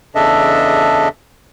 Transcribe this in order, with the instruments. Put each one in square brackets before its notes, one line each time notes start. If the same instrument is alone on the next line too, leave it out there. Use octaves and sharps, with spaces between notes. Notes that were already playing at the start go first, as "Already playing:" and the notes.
[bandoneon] E2 C#3 D4 A4 D#5 E5